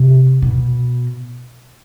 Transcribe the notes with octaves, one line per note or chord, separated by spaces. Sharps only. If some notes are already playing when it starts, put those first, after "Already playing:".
Already playing: C3
B2